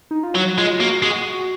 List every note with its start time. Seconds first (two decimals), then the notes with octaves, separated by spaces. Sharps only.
0.11 D#4
0.23 F4
0.35 F#3 F#4
0.58 G#3 F4
0.73 F4
0.80 A#3 F#4
1.03 G#3 F#4